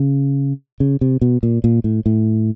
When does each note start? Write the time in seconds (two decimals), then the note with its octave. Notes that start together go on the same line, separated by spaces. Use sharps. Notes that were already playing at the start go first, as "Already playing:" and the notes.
Already playing: C#3
0.80 C#3
1.01 C3
1.21 B2
1.43 A#2
1.64 A#2
1.84 A2
2.06 A2